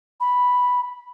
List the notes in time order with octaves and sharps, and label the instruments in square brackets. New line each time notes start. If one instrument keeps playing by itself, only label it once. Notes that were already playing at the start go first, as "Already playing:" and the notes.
[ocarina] B5